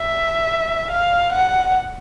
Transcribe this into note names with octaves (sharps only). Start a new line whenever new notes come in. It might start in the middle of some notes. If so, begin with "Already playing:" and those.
Already playing: E5
F5
F#5